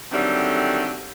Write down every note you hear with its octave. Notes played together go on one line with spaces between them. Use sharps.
D3 D#3 F#3 G3 A3 C4